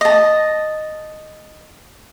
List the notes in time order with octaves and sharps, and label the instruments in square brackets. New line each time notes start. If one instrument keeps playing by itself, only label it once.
[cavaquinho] D#5 A5